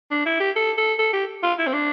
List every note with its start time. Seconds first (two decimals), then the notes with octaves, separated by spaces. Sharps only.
0.11 D4
0.26 E4
0.40 G4
0.56 A4
0.78 A4
0.99 A4
1.13 G4
1.43 F4
1.59 E4
1.66 C4
1.73 D4